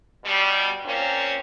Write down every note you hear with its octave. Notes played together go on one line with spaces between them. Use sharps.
B2 G3
A#2 A#3 C4 C#4